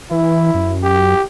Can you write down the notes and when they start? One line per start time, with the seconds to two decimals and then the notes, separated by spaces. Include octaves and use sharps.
0.11 E3 E4
0.54 F#2
0.83 G4